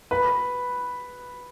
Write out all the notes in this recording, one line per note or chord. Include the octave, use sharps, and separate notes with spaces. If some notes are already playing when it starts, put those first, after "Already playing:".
B4